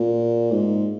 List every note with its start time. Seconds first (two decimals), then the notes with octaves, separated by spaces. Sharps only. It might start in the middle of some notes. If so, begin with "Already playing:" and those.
Already playing: A#2
0.51 G#2